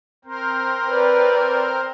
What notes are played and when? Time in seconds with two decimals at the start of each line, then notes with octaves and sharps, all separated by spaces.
0.25 C4 A#4 C5
0.89 B4 D5